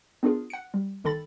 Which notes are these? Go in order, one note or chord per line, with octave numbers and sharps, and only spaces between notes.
B3 D4 F4 G#4 A#4
F#5 C#7
G3
G1 D#3 A4 B5 A6